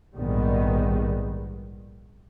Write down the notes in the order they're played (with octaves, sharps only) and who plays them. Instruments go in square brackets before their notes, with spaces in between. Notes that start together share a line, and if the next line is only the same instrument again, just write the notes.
[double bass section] A#1 G#2 D#3 G3 B3